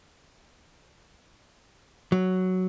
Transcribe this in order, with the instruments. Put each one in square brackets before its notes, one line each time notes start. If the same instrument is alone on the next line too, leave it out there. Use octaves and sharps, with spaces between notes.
[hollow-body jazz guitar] F#3